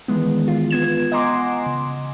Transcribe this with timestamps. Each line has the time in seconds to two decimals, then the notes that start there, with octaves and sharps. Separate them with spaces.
0.08 D#3 E3 G#3 B3
0.48 F4
0.70 B3 G#6 E7
0.83 B3
1.12 D#5 F#5 G#5 A#5 C6 D6
1.66 C#3